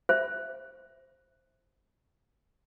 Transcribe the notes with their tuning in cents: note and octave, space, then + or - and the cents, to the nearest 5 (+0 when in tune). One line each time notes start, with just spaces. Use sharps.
C5 +10 E5 +0